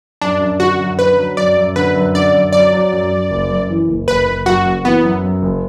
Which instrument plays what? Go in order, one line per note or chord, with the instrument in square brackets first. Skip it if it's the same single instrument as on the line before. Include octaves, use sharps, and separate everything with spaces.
[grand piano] F#2 [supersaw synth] D4
[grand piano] F#2
[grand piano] D3 [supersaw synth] F#4
[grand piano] F#2
[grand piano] D3 [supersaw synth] B4
[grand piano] F#3
[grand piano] F#2 [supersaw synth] D5
[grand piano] F#2
[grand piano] D3 [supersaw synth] B4
[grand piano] F#2
[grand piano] D3 [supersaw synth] D5
[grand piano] F#2
[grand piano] F#3 [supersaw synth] D5
[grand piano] F#3
F#2
F#2
F#1
F#2
E3
F#1
[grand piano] F#1 [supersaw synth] B4
[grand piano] F#1
[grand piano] F#2 [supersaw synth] F#4
[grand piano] F#1
[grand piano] E3 [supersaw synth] B3
[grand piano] F#2
F#2
F#1